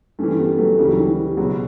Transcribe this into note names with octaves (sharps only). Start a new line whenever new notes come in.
G2 E3 A3 C#4
G3 B3
F#3 A3
D2 C#3 E3 G3
F#3
E3 G3
G3
C#2 B2 F#3